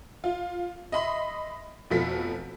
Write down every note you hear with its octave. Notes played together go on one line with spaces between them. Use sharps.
F4
D#5 E5 B5 C6
F1 B2 F3 A4 B6